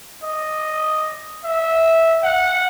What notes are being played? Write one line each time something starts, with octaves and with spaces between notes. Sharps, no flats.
D#5
E5
F#5